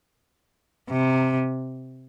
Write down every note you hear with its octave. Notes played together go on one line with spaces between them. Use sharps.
C3